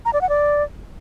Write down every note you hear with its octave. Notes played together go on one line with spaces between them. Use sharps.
A#5
D5
F#5
D5